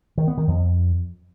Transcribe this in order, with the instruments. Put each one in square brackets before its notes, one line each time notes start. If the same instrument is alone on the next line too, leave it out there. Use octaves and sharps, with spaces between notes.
[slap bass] D#3
B3
D#3
F2